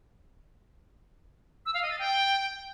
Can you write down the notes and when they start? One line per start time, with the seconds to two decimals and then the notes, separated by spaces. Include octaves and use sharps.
1.66 E6
1.74 F5
1.82 D#5
1.91 A6
1.99 G5